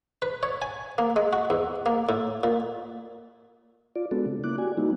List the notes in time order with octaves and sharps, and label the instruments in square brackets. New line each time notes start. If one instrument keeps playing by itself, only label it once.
[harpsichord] B4
C#5
G#5
A#3
G#3
F#4
E2
A#3
A2
A#2
[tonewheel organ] F4 D5
G#3 B3 C4 D4 F#4 A4
C#3
A#3 C#4 E4 D6 F#6
F#4 G4 D5 G#5
G3 A#3 C4 D#4 E4 F#4